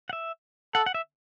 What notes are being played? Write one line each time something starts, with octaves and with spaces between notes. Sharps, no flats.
F#5
E5
A4 F#5
F#5
E5